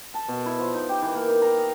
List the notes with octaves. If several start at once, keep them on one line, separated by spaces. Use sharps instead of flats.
A5
B2
E4
F3
D#4
G4
E3
A#3
D#4
A#5
D#5